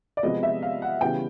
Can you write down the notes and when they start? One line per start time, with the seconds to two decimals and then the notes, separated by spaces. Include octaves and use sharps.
0.17 D5
0.23 C3 F3 G#3 B3 D#5
0.43 E5
0.63 F5
0.82 F#5
1.01 C#3 E3 G3 B3 G5